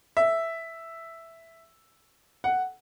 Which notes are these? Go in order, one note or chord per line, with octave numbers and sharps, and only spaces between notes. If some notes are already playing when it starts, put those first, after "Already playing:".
E5
F#5